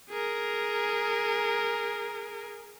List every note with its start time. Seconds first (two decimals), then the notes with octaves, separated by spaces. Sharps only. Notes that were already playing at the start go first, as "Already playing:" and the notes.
0.10 G#4 A#4